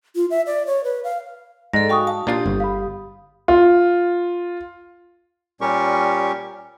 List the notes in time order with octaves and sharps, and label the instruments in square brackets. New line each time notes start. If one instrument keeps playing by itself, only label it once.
[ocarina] F4
E5
D5
C#5
B4
F5
[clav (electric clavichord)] G#2 [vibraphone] A4 D5 [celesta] D#5 A#6
[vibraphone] F#4 F5 G#5 [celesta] G5 C#6 D#6
[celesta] F5 [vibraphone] A5
[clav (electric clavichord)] A#2 D4 F4 [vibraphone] G4 D#6
[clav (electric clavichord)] G1
[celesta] F5 B5
[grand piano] F4
[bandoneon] A#2 G3 C#4 G4 A#4 C#6